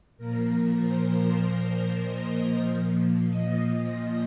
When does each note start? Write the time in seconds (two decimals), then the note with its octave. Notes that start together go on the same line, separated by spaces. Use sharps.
0.18 A#2 F3 A#4
0.79 C5
2.03 D#5
2.64 A#2 F3
3.27 D#5